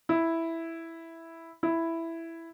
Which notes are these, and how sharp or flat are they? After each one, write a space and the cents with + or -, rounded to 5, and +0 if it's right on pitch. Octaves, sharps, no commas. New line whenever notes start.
E4 +0
E4 +5